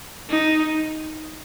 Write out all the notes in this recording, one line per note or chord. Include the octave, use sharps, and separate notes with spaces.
D#4